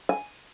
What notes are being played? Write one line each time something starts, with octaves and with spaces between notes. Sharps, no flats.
G#5